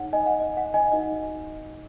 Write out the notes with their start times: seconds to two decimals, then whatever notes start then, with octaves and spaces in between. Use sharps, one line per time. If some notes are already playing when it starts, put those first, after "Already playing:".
Already playing: D#4 G#4 C#5 F#5
0.13 D#5 G#5
0.26 F#5
0.40 D#5
0.57 F#5
0.74 D#5 G#5
0.92 D#4 F#4 A#4 D#5